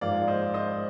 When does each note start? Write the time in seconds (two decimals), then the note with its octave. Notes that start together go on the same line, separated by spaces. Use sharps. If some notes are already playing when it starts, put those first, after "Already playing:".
0.01 G#2 F3 A#3 D5 F5
0.28 C5 D#5
0.54 C5 D#5